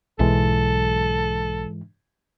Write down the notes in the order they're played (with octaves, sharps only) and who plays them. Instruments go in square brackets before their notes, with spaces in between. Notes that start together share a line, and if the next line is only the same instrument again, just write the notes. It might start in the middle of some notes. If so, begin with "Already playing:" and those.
[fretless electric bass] B1 [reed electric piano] G#2 E3 G#3 [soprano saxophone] A4